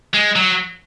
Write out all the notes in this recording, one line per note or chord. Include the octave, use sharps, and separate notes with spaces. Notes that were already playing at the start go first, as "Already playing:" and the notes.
G#3
F#3